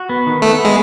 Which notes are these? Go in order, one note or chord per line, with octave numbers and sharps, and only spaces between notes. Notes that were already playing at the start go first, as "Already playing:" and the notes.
Already playing: F#4
B3
D#3
A3 B3
B3
G#3